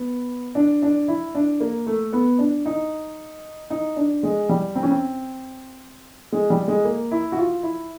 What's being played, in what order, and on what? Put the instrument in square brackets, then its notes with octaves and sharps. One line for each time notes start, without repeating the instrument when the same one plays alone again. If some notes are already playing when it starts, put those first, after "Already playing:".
Already playing: [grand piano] B3
D4
D4
E4
D4
A#3
A3
B3
D4
D#4
D#4
D4
G#3
G3
C4
C#4
C4
G#3
G3
G#3
A#3
E4
F#4
F4
E4